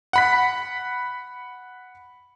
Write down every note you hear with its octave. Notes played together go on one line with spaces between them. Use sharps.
F#5 B5 B6